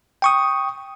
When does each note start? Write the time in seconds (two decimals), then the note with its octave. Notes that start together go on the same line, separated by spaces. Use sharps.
0.22 G5 C#6 D#6